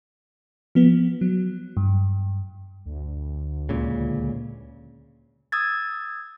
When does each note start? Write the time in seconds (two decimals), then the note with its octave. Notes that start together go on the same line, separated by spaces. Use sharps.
0.75 F3 B3
1.21 F#3
1.77 G2
2.85 D2
3.69 C#2 A#2 C#3
5.52 D#6 E6 G#6 A6